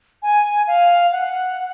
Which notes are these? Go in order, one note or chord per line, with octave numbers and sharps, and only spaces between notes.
G#5
F5
F#5